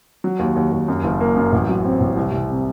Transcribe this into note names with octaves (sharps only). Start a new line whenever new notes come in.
F#3
D#2
D#2
D#2
F#2
F#1
A#3
F#2
A1
F#3
C4
A1
C2
C2
C3